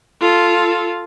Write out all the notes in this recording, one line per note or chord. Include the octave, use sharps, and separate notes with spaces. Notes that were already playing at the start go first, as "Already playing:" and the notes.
F4 A4